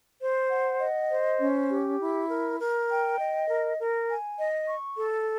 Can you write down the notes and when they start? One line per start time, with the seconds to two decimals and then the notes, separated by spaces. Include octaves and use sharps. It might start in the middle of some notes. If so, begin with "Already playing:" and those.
0.21 C5
0.50 F#5
0.80 D#5
1.11 C5
1.40 C#4
1.70 G4
2.00 E4
2.30 A#4
2.59 A#4
2.89 G5
3.19 D#5
3.49 A#4
3.79 A#4
4.08 G#5
4.38 D#5
4.68 C#6
4.98 A4